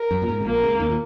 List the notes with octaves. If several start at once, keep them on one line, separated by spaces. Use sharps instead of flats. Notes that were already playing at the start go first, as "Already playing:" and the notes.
Already playing: A#4
F#2
A#2
G#2
C#3
A#1 A#2 A#3
C#2 C#3
D#2 D#3
A#2